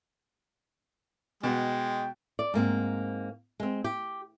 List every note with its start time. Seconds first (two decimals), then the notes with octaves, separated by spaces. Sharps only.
1.43 B2 G#3 G5
2.39 D5
2.54 G#2 A#3 C4
3.60 G#3 C4
3.84 G4